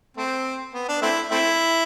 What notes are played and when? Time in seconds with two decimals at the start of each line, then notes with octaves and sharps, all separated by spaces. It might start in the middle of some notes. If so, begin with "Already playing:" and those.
0.17 A3 C4
0.74 B3
0.89 D4
1.02 A3 C4 E4
1.31 A3 C4 E4